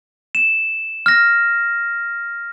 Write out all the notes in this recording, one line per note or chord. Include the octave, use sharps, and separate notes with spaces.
E7
F6 A#6